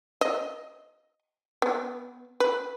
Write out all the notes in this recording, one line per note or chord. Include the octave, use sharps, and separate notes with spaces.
D#5
B3
B4